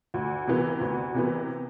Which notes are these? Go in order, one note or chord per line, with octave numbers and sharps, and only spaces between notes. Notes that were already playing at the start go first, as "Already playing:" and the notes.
D2
C3 E3 B3
D2
C3 E3 B3